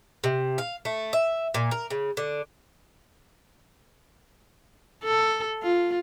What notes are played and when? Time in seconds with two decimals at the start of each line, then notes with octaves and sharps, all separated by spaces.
0.24 C3
0.58 F5
0.85 A3
1.13 E5
1.54 A#2
1.71 A#4
1.90 C#3
2.17 D3
5.04 A4
5.63 F4